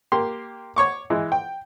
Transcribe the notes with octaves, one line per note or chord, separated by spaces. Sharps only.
A#3 G4 C6
C#5 C#6 D6
E3 G#3
G5